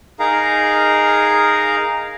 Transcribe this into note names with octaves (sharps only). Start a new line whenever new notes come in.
D#4 G#4 A#4 F5 A#5